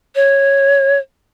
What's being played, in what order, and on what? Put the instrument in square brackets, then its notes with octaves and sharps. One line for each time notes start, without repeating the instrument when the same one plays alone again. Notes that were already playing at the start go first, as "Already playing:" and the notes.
[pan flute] C#5